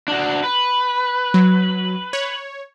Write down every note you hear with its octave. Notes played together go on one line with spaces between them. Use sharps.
D4 F#4
B4
F#3
C#5